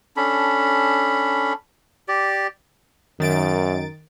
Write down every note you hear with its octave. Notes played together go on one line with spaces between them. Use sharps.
C#4 D4 A4 B5
G4 D5
F#2 D#3 A6 D7